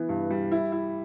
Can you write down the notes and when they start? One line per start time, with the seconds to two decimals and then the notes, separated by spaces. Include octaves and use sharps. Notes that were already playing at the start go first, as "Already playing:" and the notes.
Already playing: E3 B3
0.09 G2
0.30 G3
0.52 E4
0.72 E4